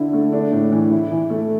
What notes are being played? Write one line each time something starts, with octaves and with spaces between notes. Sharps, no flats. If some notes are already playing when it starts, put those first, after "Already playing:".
Already playing: D3 E4
A3
D4
A2
E3
E4
E3
A3